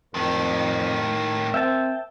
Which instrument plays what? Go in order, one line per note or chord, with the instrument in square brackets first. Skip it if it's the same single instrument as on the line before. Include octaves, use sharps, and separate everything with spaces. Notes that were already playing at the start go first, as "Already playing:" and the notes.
[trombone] F2 [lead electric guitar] A2 D#3 [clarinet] A#4
[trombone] C4 [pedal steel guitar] E5 G5 A5